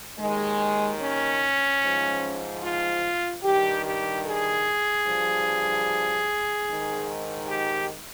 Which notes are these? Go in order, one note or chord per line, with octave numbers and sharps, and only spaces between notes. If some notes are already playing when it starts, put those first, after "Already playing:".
D#2 D#3 G#3
C#4
G#2 F3
F4
G2 D#3 G4
G4
G#4
G2 F3
G#2 D#3
G4